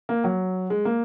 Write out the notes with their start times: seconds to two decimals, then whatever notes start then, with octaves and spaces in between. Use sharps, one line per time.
0.09 A#3
0.24 F#3
0.70 G#3
0.85 A#3